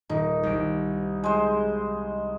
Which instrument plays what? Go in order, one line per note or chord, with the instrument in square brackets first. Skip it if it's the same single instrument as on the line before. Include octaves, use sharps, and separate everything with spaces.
[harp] D#1 [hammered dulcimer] D#4
[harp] C2 D7
[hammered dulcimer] G#3 C5